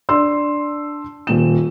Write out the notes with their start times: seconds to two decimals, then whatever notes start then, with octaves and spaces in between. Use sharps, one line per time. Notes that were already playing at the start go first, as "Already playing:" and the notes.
0.09 D4 C6 E6
1.27 D#1 D#2 E7